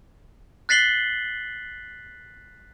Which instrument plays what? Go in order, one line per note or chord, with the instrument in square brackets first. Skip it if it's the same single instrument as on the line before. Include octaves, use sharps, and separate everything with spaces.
[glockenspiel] F#6 A6 B6 C7 F#7 G7